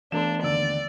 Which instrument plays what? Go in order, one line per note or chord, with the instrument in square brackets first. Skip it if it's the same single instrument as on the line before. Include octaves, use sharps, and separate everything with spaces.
[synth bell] E3 A3 B3 [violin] D4 [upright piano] A4 E7
[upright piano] D#2 D3 E6 [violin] D5